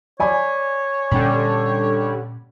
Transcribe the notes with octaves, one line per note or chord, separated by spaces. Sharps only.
C#5 D5 G#5 B5
A#2 D3 G3 C#4